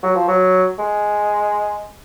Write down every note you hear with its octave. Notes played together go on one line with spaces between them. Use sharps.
F#3
F3
F#3
G#3